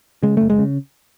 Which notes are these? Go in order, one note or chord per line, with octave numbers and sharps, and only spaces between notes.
C#3 G#3
F#1 A3
G#3
C#3